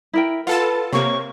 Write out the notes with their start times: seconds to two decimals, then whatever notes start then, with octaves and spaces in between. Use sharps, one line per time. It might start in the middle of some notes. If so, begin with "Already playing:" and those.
0.13 E4 A#4 G5
0.47 F4 A4 B4 F#5 A5
0.93 C3 A#3 C#5 C#6